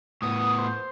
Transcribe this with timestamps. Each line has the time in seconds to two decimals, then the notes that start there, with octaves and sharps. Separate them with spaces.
0.22 A2 B3 D#6
0.58 C5